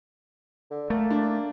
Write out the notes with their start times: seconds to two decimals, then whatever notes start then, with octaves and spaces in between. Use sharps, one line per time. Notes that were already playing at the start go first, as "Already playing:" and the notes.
0.71 D3
0.90 A3 A#3
1.10 D4